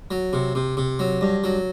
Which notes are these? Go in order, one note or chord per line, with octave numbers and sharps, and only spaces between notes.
F#3
C3
C3
C3
F#3
G2
F#3